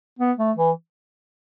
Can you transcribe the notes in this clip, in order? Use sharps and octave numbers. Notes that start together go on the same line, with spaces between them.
B3
A3
E3